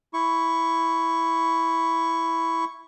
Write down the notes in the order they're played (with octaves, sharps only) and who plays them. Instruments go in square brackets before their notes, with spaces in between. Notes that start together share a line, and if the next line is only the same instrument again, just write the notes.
[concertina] E4 C#6